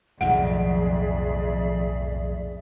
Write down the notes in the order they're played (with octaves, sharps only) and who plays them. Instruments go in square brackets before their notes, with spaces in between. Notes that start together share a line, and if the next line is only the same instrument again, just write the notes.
[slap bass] B1 A2 D#3 [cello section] F2 [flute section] G#4 D5 E5 [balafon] F#5